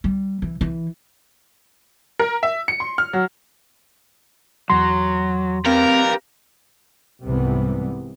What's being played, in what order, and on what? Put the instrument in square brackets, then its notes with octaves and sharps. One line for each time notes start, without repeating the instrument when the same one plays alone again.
[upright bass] G3
E3
E3
[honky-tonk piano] A#4
E5
C#7
C6
F6
F#3
[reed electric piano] E2 C6 [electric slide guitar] F#3
[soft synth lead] C4 [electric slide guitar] G4 B4 F5 [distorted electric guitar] A#4
[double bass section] C2 G#2 C3 E3 G3 B3